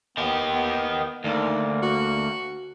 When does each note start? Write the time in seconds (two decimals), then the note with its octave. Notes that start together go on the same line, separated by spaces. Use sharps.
0.17 D#2 D#3 B3 G4
0.52 B3
1.24 D2 D#3 A#3
1.82 F#4